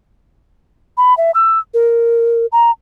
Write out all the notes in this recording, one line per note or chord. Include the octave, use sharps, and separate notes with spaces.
B5
E5
E6
A#4
A#5